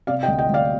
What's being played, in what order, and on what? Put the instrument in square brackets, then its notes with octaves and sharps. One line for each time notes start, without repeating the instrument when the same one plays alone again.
[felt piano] C3 D5 F5
D#5 G5
D2
D#5 G5
D2 D5 F5